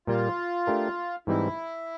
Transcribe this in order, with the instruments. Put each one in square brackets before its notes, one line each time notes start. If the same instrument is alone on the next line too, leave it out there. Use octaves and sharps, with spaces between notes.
[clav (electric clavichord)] A#2 G3 A#3 [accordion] F4
[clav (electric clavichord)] A3 D4 G4 A#4
[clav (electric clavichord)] G#2 E3 G3 C4 D#4 [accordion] E4